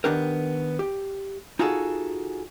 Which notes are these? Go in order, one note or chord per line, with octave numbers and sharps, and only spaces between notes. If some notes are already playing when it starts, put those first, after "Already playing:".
D#3 A3 B3 D4 G4 A#4
G4
D#4 F4 F#4 G#4 A4